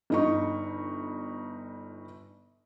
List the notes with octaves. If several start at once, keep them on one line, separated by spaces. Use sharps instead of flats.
G1 D#4 C#6